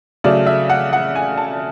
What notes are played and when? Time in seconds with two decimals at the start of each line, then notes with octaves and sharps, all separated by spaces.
0.24 C#3 F#3 A3 D5
0.46 E5
0.69 F#5
0.93 F#5
1.15 G#5
1.37 A5